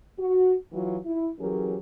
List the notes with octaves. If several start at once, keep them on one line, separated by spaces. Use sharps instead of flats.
F#4
E3 F#3 F4 F#4
E4
E3 F#3 C#4 G4 G#4 A#4